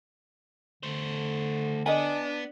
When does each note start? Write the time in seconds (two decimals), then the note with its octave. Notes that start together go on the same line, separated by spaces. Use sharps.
0.83 D3 A3 C5
1.86 B3 D4 D#5 G#5